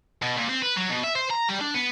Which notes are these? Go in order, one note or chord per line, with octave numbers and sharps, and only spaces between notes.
B2
A#2
C4
B4
F#3
B2
E5
C5
A#5
G3
D4
B3